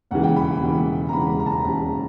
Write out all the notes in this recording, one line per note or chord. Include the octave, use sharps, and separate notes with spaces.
E1 D#2 C#3 E3 F#5
G5
B5
E1 D#2 C#3 E3
A#5
E1 D#2 C#3 E3 B5
B5
A#5
A5
A#5
E1 D#2 C#3 E3 A#5